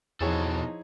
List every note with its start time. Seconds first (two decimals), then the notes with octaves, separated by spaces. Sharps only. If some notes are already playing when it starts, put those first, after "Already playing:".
0.21 E2 B2 F3 D#4 E4 G#4 A4 C#5